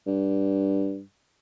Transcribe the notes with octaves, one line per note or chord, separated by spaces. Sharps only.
G2